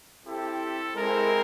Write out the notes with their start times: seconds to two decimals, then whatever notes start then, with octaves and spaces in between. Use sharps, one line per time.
0.24 C4 E4 G4 A4
0.95 G#3 C4 E4 A#4